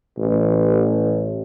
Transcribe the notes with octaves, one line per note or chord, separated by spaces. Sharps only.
A1